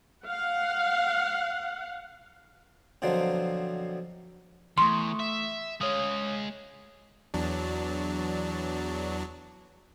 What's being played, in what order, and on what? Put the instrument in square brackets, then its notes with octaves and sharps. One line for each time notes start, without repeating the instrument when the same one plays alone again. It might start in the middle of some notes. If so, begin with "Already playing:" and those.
[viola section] F5 F#5
[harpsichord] B2 D3 F3 F#3 C4
[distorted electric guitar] E2 [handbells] A3 C#6 [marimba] C6
[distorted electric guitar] E5
[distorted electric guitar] G#3 F5 [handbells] C#5 D#6
[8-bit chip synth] E2 F#3 D4